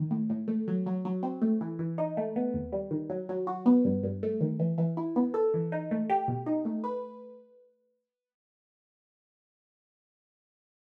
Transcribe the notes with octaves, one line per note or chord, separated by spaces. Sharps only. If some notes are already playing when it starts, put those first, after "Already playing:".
Already playing: D#3
A2
A2
A3
F#3
F#3
F#3
C4
A3
E3
E3
D#4
A3
B3
D#2
G3
D#3
F#3
F#3
F#4
B3
G2
G2
A3
D#3
E3
E3
E4
B3
A4
E3
D#4
A3
G4
B2
D#4
A3
B4